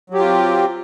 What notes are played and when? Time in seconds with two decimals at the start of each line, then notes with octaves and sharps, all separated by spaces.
0.10 F#3
0.14 G4
0.19 F4
0.23 C4